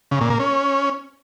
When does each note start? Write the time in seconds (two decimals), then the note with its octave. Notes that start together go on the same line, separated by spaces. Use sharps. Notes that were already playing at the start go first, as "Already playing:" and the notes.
0.11 C#3
0.21 A#2
0.30 A#3
0.40 C#4